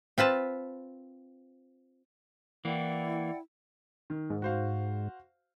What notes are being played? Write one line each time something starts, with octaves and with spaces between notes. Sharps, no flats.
C4 F4 B4 A5
E3 A#3 E4 D5 F#5 G5
D#3
G#2
F#4 C5 F5